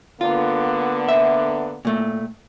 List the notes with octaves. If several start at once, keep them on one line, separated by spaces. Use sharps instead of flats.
D3 A#3 B3 F4
E5
A#2 A3